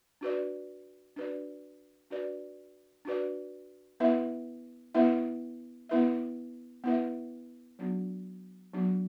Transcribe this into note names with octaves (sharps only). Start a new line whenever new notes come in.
D4 F#4 B4 D5
D4 F#4 B4 D5
D4 F#4 B4 D5
D4 F#4 B4 D5
B3 E4 B4 E5
B3 E4 B4 E5
B3 E4 B4 E5
B3 E4 B4 E5
F#3 B3 D4 F#4
F#3 B3 D4 F#4